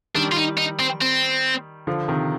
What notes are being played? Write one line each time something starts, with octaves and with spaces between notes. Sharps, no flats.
D#3 G3 D4
F4
D#4
D#4
C4
C4
D3 F3
C3 D#3